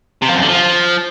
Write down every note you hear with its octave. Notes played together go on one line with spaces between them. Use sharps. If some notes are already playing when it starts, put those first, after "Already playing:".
C3
F3
F#2
D3
F3